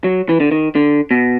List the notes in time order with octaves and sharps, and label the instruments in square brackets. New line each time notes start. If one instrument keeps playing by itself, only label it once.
[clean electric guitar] F#3
E3
D3
D#3
D3
B2